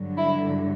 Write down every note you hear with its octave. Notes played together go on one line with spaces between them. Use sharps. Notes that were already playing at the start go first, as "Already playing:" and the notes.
Already playing: G2 D3 F#3
E4